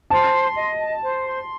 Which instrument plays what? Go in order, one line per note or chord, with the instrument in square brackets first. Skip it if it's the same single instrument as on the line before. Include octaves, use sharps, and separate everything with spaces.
[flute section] C5 [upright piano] A5
[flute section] C6
D#5
A5
C5
C6